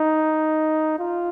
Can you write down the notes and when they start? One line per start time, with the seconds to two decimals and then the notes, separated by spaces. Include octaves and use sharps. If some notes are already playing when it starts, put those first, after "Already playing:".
Already playing: D#4
0.99 F4